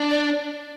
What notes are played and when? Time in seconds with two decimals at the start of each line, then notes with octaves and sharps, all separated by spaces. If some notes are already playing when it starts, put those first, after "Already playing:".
Already playing: D4
0.10 D5